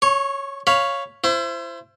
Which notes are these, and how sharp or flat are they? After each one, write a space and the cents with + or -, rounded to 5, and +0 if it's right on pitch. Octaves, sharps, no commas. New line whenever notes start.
C#5 +0 C#6 -35
C#5 +0 F5 +0 B5 +0
E4 +35 C5 +0